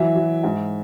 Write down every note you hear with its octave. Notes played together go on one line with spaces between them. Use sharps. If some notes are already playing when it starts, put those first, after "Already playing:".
Already playing: E3 F#3 E5
F#3
G#2